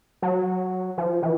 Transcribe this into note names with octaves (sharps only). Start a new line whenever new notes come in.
F#3
F3
E3